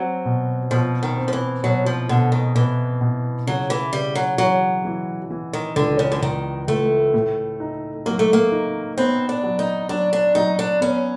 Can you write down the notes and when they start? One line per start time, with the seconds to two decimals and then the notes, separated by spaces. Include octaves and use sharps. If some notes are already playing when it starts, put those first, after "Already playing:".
Already playing: F#3 C4
0.25 B2
0.71 B2 F3
1.03 D#3
1.17 C4
1.28 F3
1.33 E3
1.63 B2 F#3
1.86 F3
2.09 B2 D3
2.32 D#3
2.55 B2 E3
3.01 B2
3.47 C#3 F#3
3.70 E3
3.93 C#3 G3
4.15 F#3
4.38 E3 F#3
4.85 E3
5.30 E3
5.53 D#3
5.76 C#2 D3
5.99 C#3
6.12 D3
6.22 C#2 D#3
6.68 C#2 A3
7.14 A2
7.60 D#4
8.06 F#3 A#3
8.19 A3
8.33 A#3
8.52 D#4
8.98 B3 C4
9.29 D4
9.44 F#3
9.59 D#4
9.89 F#3 D4
10.13 D4
10.35 F#3 D#4
10.59 D4
10.81 B3 C#4